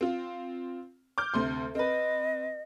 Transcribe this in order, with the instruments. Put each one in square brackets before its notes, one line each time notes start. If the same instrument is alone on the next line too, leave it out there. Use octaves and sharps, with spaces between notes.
[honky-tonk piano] C4 F4
D6 F6 G6
D2 C3 C6
[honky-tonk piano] C4 B4 [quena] D#5